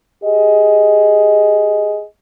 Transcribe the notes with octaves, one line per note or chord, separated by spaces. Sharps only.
G4 G#4 D#5